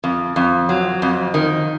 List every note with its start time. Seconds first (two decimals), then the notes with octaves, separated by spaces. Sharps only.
0.04 F2
0.36 F2
0.69 F#3
1.02 F2
1.34 D#3